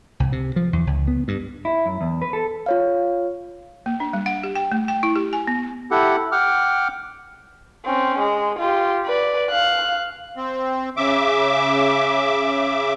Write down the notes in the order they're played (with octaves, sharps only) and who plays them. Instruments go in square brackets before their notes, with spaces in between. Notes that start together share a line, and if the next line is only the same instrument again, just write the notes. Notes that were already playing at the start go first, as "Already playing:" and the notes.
[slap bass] C2
C3
F3
E2
C#2
B3
G2
[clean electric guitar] E4
F#2
E2
B4
A4
[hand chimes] F4 C#5 F5
[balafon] A#3
D4
G3
F#5
G4
G5
A3
G5
E4
G4
G#5
B3
[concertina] E4 G4 A4 F#5
F#5 G5 D6 F6
[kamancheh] C4 C#4
G#3
F4 G4
B4 D5
F5 F#6
[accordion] C4
C#3 E5 D6